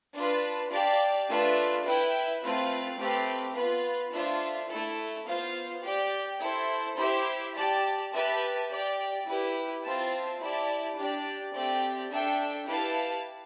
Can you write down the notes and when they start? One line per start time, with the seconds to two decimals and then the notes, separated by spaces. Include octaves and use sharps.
0.15 D4 F4 B4
0.71 G4 D5 F5 A5
1.29 A3 D4 F4 B4 E5
1.85 E4 B4 E5 G5
2.43 A3 C4 F4 B4 F5
2.99 A3 C4 G4 B4 F5
3.56 B3 F4 B4
4.13 A3 D4 F4 C5 E5
4.70 A3 E4 A4
5.26 B3 F4 C5 F5
5.84 G4 D5 G5
6.41 E4 A4 C5
6.98 E4 G4 C5 E5
7.55 G4 D5 A5
8.12 G4 B4 E5 A5
8.69 G4 D5 G5
9.25 E4 G4 B4
9.83 C4 F4 C5 E5 A5
10.39 E4 G4 D5 A5
10.96 D4 G4 D5
11.53 A3 C4 G4 D5 G5
12.11 D4 A4 E5 G5
12.67 E4 G4 B4 F5 A5